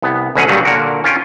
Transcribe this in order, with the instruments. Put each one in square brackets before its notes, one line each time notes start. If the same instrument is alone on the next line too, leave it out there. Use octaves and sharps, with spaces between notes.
[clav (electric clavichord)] C2 B3
D2 B2 F#3 C#4 G#4 B4
G2 A#2 C#3 F#3 G3
A#2 D3 F#4 A#4
C#4 F4 G5